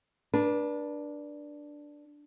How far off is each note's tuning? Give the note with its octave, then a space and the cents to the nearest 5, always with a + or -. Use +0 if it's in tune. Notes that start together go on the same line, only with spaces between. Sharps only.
D4 +0 B4 -40